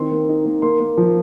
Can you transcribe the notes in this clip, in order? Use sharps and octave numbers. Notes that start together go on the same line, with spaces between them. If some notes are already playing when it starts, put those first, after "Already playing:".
Already playing: D#3 C4 C6
A#3
D#4
A#3
A#3 C6
A#3
F3